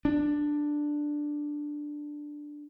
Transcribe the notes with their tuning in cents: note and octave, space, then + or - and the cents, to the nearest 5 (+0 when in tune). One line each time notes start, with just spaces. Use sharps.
D4 +5